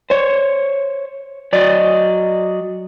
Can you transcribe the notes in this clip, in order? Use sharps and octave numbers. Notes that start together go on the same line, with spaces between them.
C5 C#5
F#3 D5 D#5